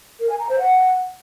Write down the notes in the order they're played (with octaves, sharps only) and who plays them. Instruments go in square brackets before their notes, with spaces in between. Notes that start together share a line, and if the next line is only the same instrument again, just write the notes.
[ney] A#4
G#5
A#5
C5
F#5